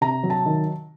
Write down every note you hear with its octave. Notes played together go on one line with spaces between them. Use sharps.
C3 A#5
F#3
A5
D#3